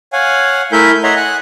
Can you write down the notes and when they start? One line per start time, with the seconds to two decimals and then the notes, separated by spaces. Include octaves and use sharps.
0.13 C#5 F5 F#5 G#5
0.72 A3 E4 A#4 E5 G#5 G6
1.03 C#5 D#5 E5 F#5 A#5 C6
1.16 F#5 G#5 F#6